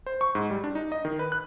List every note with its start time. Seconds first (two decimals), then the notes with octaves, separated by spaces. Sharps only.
0.06 C5
0.21 C#6
0.35 G#2
0.50 G3
0.64 D4
0.75 D#4
0.92 D#5
1.05 D#3
1.19 B4
1.32 F#6